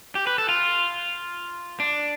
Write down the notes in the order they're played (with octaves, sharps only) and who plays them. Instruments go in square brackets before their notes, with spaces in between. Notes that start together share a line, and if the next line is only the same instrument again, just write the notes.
[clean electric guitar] G4
B4
A4
F4
D4